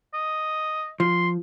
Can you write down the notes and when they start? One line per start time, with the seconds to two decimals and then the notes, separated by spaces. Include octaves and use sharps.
0.14 D#5
1.00 F3 C6